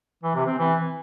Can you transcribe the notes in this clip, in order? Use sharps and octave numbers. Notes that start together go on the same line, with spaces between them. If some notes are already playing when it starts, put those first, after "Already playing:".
E3
C3
C4
E3